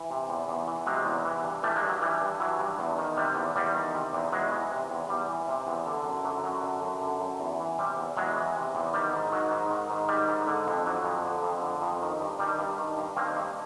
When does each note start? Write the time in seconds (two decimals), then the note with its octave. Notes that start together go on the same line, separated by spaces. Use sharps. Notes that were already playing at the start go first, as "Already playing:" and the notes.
Already playing: E3
0.10 C3
0.29 E2
0.48 E2
0.67 E3
0.86 C3 F#3 G#3
1.06 E2
1.25 E3
1.44 G2
1.63 E3 G3 A3
1.76 G#3 A#3
1.83 G2
1.89 F#3
2.01 E3 G3
2.21 G2
2.40 E3 F#3
2.59 G2
2.79 E2
2.98 D#3
3.17 C3 G3
3.36 E2
3.56 E2 G3
3.75 D#3
3.94 C3
4.13 E2
4.32 E2 F#3 G#3
4.52 E3
4.70 C3
4.90 E2
5.09 E2 G3
5.29 E3
5.48 C3
5.67 E2
5.86 D3
6.05 F#2
6.24 D3 F#3
6.39 F#3
6.44 F#2
6.63 D3
6.82 F#2
7.02 D3
7.21 F#2
7.40 E2
7.59 E3
7.78 C3 G3
7.97 E2
8.16 E2 F#3 G#3
8.36 E3
8.56 C3
8.75 E2
8.93 D#3 G3
9.13 G#2
9.32 D#3 F#3
9.51 G#2
9.71 D#3
9.90 G#2
10.08 D#3 G3
10.28 G#2
10.47 D3
10.67 F2
10.86 D3 F#3
11.05 F2
11.24 D3
11.43 F2
11.63 D3
11.82 F2
12.02 D#3
12.20 G2
12.39 D#3 G3
12.59 G2
12.78 D#3
12.97 G2
13.16 D#3 A#3 C4
13.36 G2